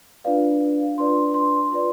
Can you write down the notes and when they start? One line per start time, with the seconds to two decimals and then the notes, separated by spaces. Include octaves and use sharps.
0.24 D4 F4 B4 D5 F5
0.98 D4 F4 B4 D5 C6
1.34 C6
1.72 F4 B4 D5